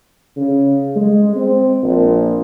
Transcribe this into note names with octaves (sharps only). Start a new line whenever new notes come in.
C#3
G#3
C4
A#1